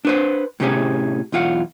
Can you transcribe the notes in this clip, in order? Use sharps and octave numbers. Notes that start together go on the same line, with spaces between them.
D4 B4 C5
A2 C3 C#4 G4 G#4
B1 E2 F4 F5 F#5